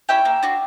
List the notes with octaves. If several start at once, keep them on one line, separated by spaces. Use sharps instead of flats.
C#4 E4 G4 E5 G5
A#3
D4 F#4